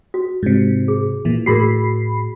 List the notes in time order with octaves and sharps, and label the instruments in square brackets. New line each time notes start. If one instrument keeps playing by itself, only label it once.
[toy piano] F#4
[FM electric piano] G#2 C3
[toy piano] G#4
[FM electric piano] A#2 E3
[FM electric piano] A2 B5 C7 [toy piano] F#4 G#4 A#4